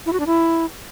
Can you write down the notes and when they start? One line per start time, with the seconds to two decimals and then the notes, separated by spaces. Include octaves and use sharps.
0.06 E4
0.13 F#4
0.20 D4
0.27 E4